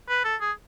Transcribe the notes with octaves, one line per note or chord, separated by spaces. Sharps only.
B4
A4
G#4